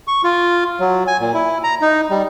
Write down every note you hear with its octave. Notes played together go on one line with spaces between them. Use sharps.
C#6
F4
F#3
G#5
A#2
E4
A#5
D#4
G3